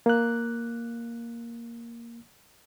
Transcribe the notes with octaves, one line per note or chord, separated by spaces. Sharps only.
A#3 F#6